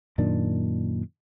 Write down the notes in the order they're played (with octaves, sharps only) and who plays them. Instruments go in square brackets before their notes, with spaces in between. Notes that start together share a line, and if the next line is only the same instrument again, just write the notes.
[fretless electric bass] F#2 A#2 D#3 D4